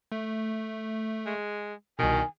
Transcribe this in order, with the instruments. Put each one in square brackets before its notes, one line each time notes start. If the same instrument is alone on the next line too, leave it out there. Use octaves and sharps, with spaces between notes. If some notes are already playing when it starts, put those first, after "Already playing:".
[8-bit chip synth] A3
[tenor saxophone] G#3
[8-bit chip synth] C2 B2 [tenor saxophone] D#3 [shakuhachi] G#5